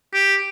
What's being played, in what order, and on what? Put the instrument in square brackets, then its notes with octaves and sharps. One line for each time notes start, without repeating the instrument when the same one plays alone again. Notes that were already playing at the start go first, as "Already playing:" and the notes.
[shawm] G4